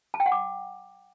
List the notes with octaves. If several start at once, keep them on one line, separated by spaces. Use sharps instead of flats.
A5
G5
F#5
D6